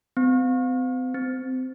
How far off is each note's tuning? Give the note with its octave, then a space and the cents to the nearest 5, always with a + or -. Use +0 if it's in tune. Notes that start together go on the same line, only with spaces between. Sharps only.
C4 -40
C4 -20